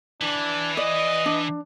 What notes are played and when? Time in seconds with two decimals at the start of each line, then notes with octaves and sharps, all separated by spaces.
0.21 E3 D4
0.77 D5 D#5
1.26 D4